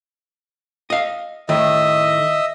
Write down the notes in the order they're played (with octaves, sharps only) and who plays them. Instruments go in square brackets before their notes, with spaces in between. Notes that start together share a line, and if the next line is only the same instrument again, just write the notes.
[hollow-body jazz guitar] D#5 F5
[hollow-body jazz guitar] A2 D#3 [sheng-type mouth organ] D#5 E5